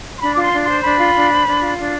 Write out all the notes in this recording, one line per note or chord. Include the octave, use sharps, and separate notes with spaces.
C6
D4 B5
D6
F4
C6
D4
C6
C5
D4 B5
F4
D4
C5
D4
F4
D4